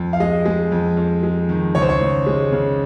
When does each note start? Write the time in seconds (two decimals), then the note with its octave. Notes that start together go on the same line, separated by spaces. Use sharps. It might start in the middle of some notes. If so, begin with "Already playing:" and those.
Already playing: F2
0.13 F5
0.20 G#3 D#5
0.46 G#3
0.72 F2
0.97 F2
1.23 G#3
1.49 D#3
1.75 C#2 C#5
1.82 C5
1.89 C#5
2.01 C#2
2.27 G#3
2.52 C#3